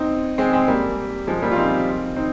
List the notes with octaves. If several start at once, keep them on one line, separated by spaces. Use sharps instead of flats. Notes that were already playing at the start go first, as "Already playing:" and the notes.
Already playing: C4 D#4
G#3 C4
G#3 C4
G3 A#3
F3 G#3
G3 A#3
F4
C4 D#4
C4 D#4